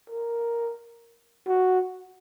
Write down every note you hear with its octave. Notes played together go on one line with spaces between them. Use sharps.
A#4
F#4